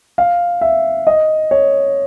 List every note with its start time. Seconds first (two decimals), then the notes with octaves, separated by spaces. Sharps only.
0.18 F5
0.61 E5
1.07 D#5
1.51 C#5